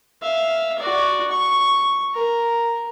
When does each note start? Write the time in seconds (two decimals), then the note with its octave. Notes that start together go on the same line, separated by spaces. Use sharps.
0.22 E5 F5
0.79 F#4 D5
1.30 C#6
2.14 A#4